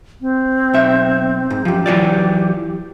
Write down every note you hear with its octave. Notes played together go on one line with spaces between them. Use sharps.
C4
B1 E5
G#2
F#2 F3 G4
E3 F#3 D5